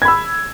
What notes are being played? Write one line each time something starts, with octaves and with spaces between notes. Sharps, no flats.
B5 E6 G#6